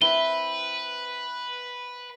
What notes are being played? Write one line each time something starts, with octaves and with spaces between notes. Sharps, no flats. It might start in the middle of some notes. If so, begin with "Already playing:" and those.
C4 E4 B4 G7